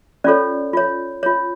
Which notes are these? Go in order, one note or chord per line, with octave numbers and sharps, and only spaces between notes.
C#4 F4 A4 C#5 D5
F4 C#5
F4 C#5